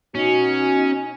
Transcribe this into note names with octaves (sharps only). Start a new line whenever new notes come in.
B2 C#4 D#4 F#4